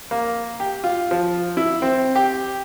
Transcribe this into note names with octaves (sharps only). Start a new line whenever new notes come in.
A#3
G4
F4
F3
E4
C4
G4